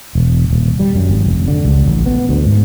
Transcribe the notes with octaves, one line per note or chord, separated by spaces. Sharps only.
E1
D#1
G3
F#2
G#1
F1
D3
C#2
A1
B3
D2
G#2